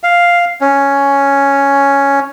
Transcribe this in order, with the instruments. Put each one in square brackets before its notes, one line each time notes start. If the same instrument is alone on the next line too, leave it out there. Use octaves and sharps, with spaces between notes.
[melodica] F5
C#4